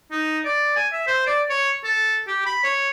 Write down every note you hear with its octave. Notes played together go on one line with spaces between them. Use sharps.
D#4
D5
G#5
E5
C5
D5
C#5
A4
G4
B5
C#5